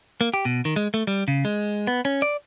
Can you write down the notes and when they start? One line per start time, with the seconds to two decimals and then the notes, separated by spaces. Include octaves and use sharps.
0.21 A#3
0.34 G4
0.45 B2
0.65 D#3
0.76 G#3
0.94 A3
1.07 G3
1.28 C#3
1.45 G#3
1.87 B3
2.05 C#4
2.22 D5